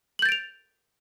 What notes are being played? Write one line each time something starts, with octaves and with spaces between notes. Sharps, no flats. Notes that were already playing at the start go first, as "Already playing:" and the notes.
G6 A6 D7 F7 F#7